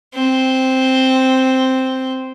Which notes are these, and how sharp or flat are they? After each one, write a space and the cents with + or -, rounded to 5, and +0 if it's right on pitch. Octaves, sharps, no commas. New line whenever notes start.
C4 +0